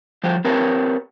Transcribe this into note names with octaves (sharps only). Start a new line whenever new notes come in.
F3 G3 A3 G4 C5
C4 G4 A#4 B4 C#5 A5